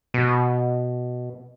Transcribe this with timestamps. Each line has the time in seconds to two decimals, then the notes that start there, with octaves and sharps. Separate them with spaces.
0.14 B2